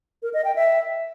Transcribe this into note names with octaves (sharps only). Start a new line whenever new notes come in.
A#4
D#5
G5
E5